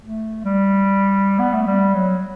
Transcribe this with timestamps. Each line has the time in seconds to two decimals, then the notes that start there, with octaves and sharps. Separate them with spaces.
0.03 A3
0.44 G3
1.39 B3
1.53 A3
1.67 G3
1.94 F#3